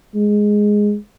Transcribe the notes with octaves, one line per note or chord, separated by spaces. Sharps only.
G#3